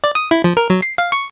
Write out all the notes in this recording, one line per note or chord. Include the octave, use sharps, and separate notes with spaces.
D5
D#6
E4
F3
A#4
F#3
C7
F5
C#6